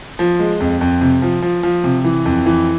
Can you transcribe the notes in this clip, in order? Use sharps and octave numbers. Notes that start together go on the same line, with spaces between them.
F3
G#3
F2
F2
C3
F3
F3
F3
C3
E3
F2
E3